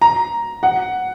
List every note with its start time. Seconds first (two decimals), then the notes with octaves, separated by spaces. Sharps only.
0.02 A#5
0.63 F#5